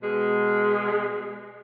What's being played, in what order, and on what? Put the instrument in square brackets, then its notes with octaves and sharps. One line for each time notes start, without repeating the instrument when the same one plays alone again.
[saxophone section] B2 G#3